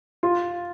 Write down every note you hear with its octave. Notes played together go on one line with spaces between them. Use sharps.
F4